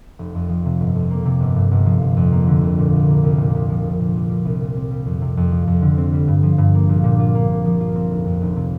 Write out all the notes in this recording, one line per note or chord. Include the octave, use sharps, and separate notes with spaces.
F1
F2
F3
C3
G1
F2
A#3
C3
G1
G2
G1
F3
G1
F2
A#3
D3
C2
A#2
C2
A#3
C2
A#2
C2
F3
A#1
A#2
A#1
G3
C2
A#2
C4
G3
F2
C3
F2
F3
F2
D3
C4
G3
G2
F3
G2
A#3
A#1
A#2
F4
A#3
A#2
F3
F4
C4
F1
F2
F1
C3